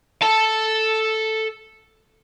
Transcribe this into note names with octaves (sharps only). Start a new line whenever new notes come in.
A4 A5